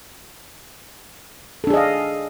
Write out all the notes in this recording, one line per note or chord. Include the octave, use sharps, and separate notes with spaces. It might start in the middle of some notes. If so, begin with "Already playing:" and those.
D4 G#4 A4 D#5 F5